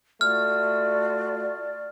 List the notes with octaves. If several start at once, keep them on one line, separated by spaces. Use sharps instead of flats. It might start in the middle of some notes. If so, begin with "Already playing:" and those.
A3 F4 F#4 D5 F6